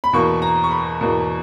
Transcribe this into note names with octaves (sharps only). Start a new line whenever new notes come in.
B5
E2 B2 A#3 C#6
A#5
C#6
B5
E2 B2 A#3